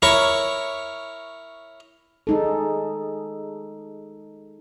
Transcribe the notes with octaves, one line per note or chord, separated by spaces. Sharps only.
E4 A#4 C#5 C#6
G#3 D#4 A4